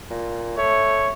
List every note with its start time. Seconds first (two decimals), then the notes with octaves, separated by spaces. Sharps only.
0.10 A#2
0.57 A3 C#5